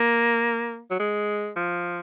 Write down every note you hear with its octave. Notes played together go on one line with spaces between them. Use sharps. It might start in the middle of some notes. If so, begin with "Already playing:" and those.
Already playing: A#3
F#3
G#3
F3